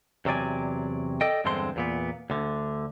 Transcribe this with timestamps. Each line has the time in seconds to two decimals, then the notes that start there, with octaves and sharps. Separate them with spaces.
0.25 E2 C3 F#3 D5 G#5
1.21 A4 D5 D#5 G5
1.44 E2 G2 D3 G#3 C4 C6
1.76 E2 A#2 B3
2.30 D2 D3